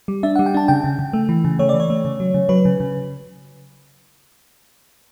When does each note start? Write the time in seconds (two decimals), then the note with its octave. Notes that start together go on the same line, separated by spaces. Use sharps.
0.08 G3
0.23 D4 E5
0.36 G3 F#5
0.46 G5
0.54 D4 A5
0.68 C#3 G5
0.84 C#3
0.99 C#3
1.13 A3
1.29 E3
1.45 C#3
1.59 A3 C#5
1.69 E3 D5
1.80 C#5
1.90 A3
2.05 C#3
2.20 F#3
2.34 C#3
2.49 F#3 B4
2.65 C#3
2.80 C#3